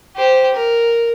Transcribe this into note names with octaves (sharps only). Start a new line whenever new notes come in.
G4 C5
A#4